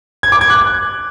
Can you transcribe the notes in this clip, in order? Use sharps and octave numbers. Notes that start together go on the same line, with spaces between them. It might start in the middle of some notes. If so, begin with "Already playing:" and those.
G#6
D6
G#6
F#6